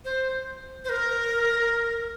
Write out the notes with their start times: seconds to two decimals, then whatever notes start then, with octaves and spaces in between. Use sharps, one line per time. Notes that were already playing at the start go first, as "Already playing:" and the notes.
0.05 C5
0.85 C5
0.89 A#4